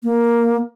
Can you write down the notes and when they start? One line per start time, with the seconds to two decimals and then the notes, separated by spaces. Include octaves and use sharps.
0.03 A#3